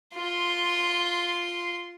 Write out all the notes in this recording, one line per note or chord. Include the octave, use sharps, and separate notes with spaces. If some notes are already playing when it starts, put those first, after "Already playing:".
F4 C6